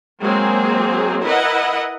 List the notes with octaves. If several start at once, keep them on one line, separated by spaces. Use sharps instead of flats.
F#3 G#3 A#3 C4 G#4
E4 A#4 B4 D#5 F#5